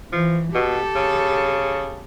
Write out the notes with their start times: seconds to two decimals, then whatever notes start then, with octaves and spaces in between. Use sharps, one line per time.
0.12 E3 F3
0.55 B2 G4 A4
0.95 C#3